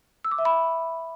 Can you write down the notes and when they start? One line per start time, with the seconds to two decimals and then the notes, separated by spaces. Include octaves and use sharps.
0.24 E6
0.31 D6
0.38 E5
0.45 B5